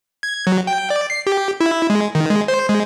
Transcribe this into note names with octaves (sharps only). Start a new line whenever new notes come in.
G#6
F#3
G5
D5
C7
G4
E4
G#3
D#3
G#3
C5
G#3